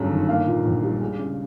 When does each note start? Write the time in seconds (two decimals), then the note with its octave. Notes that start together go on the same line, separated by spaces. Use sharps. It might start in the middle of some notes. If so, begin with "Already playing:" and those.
Already playing: G1 F#2 G#3
0.10 D#3
0.29 A#3 F5
0.46 A#2
0.65 A#1
0.83 G3
1.01 G#3
1.19 C#3